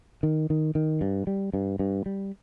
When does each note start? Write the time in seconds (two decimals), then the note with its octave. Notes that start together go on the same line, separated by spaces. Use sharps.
0.23 D#3
0.50 D#3
0.75 D#3
1.01 G2
1.27 G3
1.54 G2
1.79 G2
2.06 G3